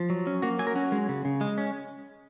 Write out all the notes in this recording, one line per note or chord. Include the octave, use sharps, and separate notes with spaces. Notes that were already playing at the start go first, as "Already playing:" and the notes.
Already playing: F3
F#3
C#4
A#3 F#4
F#3 G#5
A#4
C#4 F#4
G#3
C#3
C#3
G#3
C#4